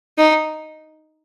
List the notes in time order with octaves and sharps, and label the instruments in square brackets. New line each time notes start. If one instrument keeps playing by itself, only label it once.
[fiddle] D#4